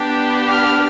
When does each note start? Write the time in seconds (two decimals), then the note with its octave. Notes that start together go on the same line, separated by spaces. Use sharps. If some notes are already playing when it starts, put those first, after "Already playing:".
Already playing: B3 D4 G4
0.48 F6